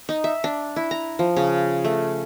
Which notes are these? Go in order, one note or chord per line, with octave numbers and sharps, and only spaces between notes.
D#4
E5
D4
E4
A#5
F3
C#3
A3